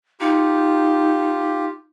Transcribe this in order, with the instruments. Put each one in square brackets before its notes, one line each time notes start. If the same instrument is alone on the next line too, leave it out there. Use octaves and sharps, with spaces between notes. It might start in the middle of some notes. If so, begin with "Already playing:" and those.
[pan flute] D#4 [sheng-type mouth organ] F4 G4